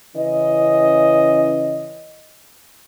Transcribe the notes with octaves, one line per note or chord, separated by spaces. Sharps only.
C#3 E3 C#4 D#5